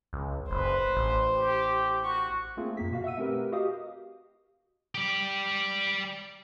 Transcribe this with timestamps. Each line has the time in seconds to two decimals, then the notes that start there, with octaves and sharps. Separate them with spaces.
0.13 C#2
0.51 F#1 B4 C5
0.97 A1
1.34 G4
2.04 F#4 C#6
2.57 A3 A#3 C4 F4 G#4
2.77 F#2 A#3 B6
2.91 B2 F#4 F5
3.04 E5 F#5 E6 D#7
3.18 A3 C4 G4 A#4 B4
3.52 F#4 G4 D#5 F5 D#6
4.95 G4 D5